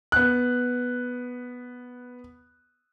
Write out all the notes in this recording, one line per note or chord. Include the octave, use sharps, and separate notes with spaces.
B3 F#6